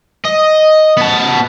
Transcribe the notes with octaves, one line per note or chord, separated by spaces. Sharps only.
D#5
B3 A5